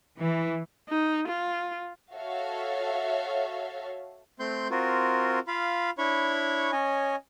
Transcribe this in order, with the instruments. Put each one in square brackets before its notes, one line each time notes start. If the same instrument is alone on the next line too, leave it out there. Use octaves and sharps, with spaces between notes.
[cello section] E3
[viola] D#4
F4
[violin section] F#4 A4 C#5 E5 F5
[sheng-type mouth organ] A3 C4 C6 G6
C4 F4 F#4 A#4
F4 F5 B5
D4 E4 C#5 B5 C#6
C#4 C#5 D#5 G#5